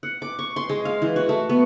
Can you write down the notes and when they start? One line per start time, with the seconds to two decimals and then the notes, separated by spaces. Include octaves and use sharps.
0.03 F#5
0.22 D6
0.39 C#6
0.56 C6
0.69 G#3
0.85 F5
1.02 E3
1.16 F#4
1.29 A3
1.49 B3